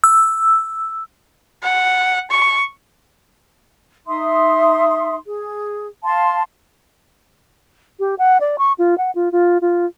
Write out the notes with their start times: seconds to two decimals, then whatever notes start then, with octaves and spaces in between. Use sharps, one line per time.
0.04 E6
1.63 F#5
2.31 C#6
4.07 D#4 E5 C6 D#6
5.26 G#4
6.04 F5 A5 C6
8.00 G4
8.18 F#5
8.40 D5
8.58 C#6
8.78 F4
8.98 F#5
9.15 F4
9.32 F4
9.62 F4